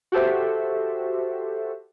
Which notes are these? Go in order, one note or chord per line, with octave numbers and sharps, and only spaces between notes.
F#4 G4 A4 C5 E5